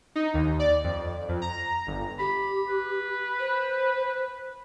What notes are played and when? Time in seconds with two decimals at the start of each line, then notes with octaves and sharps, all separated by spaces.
0.16 D#4
0.34 D#2
0.60 D5
0.84 F2
1.29 F2
1.42 A#5
1.87 G1
2.19 G4 B5
2.69 B4
3.39 C5